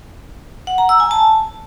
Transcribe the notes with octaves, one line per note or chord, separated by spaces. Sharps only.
F#5
A#5
E6
G#5
A5